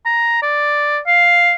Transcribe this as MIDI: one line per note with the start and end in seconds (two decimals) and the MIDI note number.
0.06 0.41 82
0.42 0.99 74
1.07 1.55 77